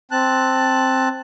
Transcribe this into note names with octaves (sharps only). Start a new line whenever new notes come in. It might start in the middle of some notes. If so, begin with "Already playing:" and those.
C4 A5 F#6